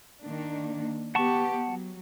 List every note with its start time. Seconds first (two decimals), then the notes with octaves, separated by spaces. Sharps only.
0.22 D#3 A#3 D4
1.15 B3 G4 F#5 A5 C#6
1.66 F#3